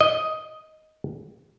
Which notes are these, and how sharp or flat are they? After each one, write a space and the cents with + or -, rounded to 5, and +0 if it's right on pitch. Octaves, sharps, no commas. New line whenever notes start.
D#5 +5